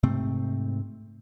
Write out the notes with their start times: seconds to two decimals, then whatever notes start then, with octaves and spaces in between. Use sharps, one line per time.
0.03 G#2 C3 A3 C4